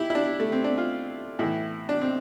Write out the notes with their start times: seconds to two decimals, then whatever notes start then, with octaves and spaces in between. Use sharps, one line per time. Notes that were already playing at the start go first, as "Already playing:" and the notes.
Already playing: E4 G4
0.10 E4
0.15 D4
0.40 A3
0.52 C4
0.64 D4
0.78 F4
1.39 A2 E3 E4
1.89 D4
2.01 C4